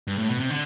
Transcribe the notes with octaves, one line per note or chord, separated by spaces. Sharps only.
G2
A2
B2
C3
D3